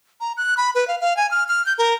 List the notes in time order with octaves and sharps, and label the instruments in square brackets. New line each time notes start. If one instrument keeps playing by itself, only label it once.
[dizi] A#5
F#6
B5
B4
F5
F5
G#5
F6
F6
G6
A#4